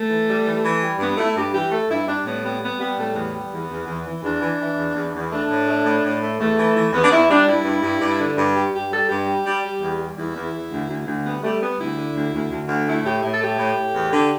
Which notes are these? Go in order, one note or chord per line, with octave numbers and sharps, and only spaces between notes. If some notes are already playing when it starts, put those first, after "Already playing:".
Already playing: A3
E3
G3
E3
E3
G3
G2 B3
A3 E4
G2 G4
E3 G4
A3 A4
G2 E4
G3 D4
A2 B3
G3 B3
G3 B3
G3 B3
A2 A3
E2 B3
G3
E2
E2
E2
E3
E2 D4
E3
E3
E2
E2
E2
A3 D4
A2
A3
A2
A2
A3
E2 A3
E3
E3
E2 B3
D4
E2 E4
G3 D4
G2 E4
G2
G2
G2
D3
G2
G3 G4
G2 G4
G3 A4
G2 G4
G3
G3
G3
E2
G3
E2 E4
E2
E2
D2
D2
D2
G3 B3
G3 A3
G3 B3
D2 E4
D3
D2
D2
D2
D2
A3 E4
A2 G4
A2 E4
A4
A3 G4
A2
A2
E2
D3